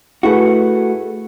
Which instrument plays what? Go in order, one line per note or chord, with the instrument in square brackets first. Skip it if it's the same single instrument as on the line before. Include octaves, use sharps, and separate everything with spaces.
[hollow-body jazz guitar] A3 F#4 [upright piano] E4 G#4 B4